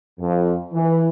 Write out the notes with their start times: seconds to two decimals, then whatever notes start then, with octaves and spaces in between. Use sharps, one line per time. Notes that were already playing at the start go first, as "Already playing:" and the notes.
0.20 F2
0.74 E3